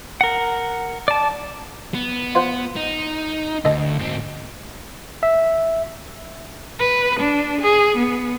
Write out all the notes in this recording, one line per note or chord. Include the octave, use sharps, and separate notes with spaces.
A#4 F#5
D5 A5
B3
F4 C5 F#5
D#4
D2 D#4 A4 A#5
G#2 C4
E5
B4
D4
G#4
B3